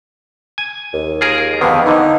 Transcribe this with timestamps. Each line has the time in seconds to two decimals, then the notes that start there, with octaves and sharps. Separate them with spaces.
0.58 G#5
0.93 D#2
1.21 F4 G#4 A#4
1.61 F2 D3 D#3 B3
1.86 D3 E3 D#4